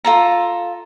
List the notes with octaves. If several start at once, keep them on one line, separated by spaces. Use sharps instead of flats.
F4 A4 A#5